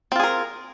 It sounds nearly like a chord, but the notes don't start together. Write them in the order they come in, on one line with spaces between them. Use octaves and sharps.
C4 F4 G#4 A#4